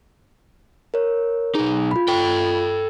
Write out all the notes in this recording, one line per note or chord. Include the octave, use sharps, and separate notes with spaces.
A#4 C#5
B1 D#4 G#4
F4 B5
A4 G5